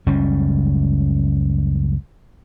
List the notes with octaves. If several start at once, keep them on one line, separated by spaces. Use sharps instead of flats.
F#1 C#2 G3 C#4